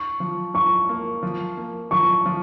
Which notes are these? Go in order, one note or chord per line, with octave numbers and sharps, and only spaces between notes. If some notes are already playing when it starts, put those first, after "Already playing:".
Already playing: C#6
F3
F3 C#6
A#3
F3
A#3
F3 C#6
F3